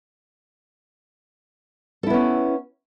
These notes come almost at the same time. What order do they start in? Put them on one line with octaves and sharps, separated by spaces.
A4 E4 B3 C#4